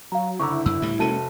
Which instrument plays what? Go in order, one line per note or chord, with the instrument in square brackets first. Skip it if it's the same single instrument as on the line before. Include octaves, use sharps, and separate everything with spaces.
[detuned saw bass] F#3 [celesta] F5 A#5
[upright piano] F#1 D3 A#5 [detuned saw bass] E4 [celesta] C#6 D6 E6
[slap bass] F#2 [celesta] E6
[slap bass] D2 A2 G3
[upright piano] F1 A4 [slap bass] G#3 A#3 C#4 [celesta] F#4 A5 D#7